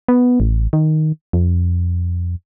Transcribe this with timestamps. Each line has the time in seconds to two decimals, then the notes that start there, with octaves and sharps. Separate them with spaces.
0.08 B3
0.40 A1
0.73 D#3
1.33 F2